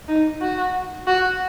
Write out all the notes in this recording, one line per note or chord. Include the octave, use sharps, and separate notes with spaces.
D#4
F#4
F#4